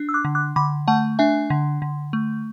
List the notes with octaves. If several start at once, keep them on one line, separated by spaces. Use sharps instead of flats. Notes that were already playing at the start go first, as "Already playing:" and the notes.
Already playing: D4
E6
D6 F#6
D3
D6 F#6
D3 B5 D6
A3 F#5 A5
D4 E5 G#5
D3
D3
A3